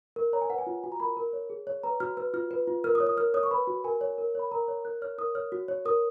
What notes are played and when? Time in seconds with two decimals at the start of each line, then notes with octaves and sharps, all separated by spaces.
0.16 A#4
0.33 C#5 A#5
0.41 G#5
0.50 B4 F#5
0.58 G#5
0.67 F4
0.84 F#4 G#5
0.92 A#5
1.00 A#4 B5
1.17 A#4
1.33 C#5
1.50 G#4
1.67 C#5
1.83 B4 A#5
2.00 F#4 F6
2.17 B4 F6
2.34 F4 F6
2.51 B4
2.67 F4
2.84 A#4 F6
2.95 D#6
3.00 C#5
3.07 D#6
3.17 A#4 F6
3.34 C#5 D#6
3.43 C#6
3.51 B4 B5
3.67 F#4
3.84 A#4 G#5
4.01 C#5
4.18 A#4
4.35 C#5 B5
4.51 A#4 A#5
4.68 C#5
4.85 A#4 F#6
5.02 C#5 F6
5.18 A#4 D#6
5.35 C#5 F6
5.52 F#4
5.68 C#5
5.85 A#4 D#6